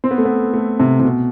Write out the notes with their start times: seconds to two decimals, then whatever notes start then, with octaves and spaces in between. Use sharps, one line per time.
0.04 C4
0.11 B3
0.18 A3
0.25 B3
0.53 A3
0.80 C3
1.00 C3
1.04 B2